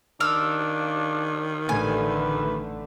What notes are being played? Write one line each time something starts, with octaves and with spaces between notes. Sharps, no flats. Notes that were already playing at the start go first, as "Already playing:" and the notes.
D#3 D4 F5 E6
A1 D3 A3 B4 G#5